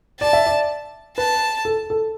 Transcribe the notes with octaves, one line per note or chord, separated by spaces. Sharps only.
D5 A5
E5
D5
B4 A5
A4
A4